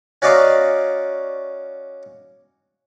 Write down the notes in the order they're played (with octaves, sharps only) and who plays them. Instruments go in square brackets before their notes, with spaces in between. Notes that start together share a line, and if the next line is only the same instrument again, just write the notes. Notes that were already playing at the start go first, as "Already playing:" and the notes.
[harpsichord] C#4 F#4 D5 D#5 F5 A#5